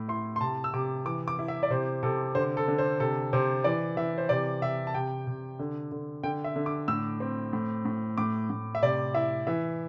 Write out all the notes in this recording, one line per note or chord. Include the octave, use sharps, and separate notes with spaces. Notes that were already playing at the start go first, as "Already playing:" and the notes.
Already playing: A2
E4 C6
C6
C3 A5
E6
C3 D6
E3 D6
D6
E4
E5
D5
C3 C5
C3 A4
D3 C5
A4
D3
C5
C3 A4
C3 C5
E3 D5
E3 E5
C5
C3 D5
C3 E5
A5
C3 G5
C3
D3
D3
D3 G5
E5
D3
D6
A2 E6
C4
A2
A2
A2 D6
A2
E5
C3 D5
E4 E5
E3 E5